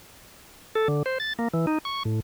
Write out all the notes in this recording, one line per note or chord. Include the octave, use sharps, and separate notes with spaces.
A4
D3
C5
A6
A#3
E3
D#4
C#6
A2